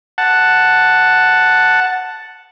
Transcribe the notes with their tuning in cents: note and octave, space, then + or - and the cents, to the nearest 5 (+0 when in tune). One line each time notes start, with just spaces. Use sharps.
F#5 +0 A5 +0